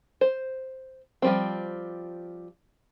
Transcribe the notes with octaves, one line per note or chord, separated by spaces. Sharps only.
C5
F3 G3 C4